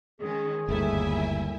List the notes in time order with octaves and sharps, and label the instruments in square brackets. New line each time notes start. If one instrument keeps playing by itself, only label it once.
[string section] D#3 G#3 C#4 [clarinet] G#4
[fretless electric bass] G1 A3 [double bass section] D#2 G#2 G3 [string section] E4 E5 G#5